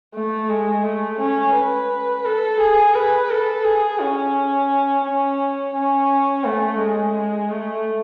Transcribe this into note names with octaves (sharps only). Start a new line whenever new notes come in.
A3
G#3
A3
C#4
B4
A4
G#4
B4
A4
G#4
C#4
C#4
C#4
A3
G#3
A3